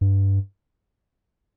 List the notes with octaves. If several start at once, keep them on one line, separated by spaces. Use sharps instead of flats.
G2